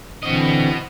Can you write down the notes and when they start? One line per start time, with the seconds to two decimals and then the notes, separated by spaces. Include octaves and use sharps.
0.23 D3 E3 C4 F#4 D#5